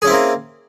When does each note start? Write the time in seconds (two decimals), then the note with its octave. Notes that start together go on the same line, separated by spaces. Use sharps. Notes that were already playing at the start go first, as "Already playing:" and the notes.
0.02 G#4
0.05 C#4
0.07 E4
0.10 C4
0.12 A#3